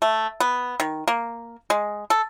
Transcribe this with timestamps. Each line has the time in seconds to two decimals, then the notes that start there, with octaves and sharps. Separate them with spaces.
0.02 A3
0.40 B3
0.80 D#3
1.08 A#3
1.70 G#3
2.10 A4